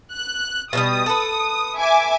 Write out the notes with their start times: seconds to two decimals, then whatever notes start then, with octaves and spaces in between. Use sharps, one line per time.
0.14 F#6
0.73 B2 F#3 G3 D#6
1.06 A4 B4
1.77 E5 G#5 D6